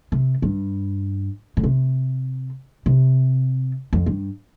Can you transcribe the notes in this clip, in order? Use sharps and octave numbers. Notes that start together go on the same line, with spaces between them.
C3
G2
A2
C3
C3
F2
G2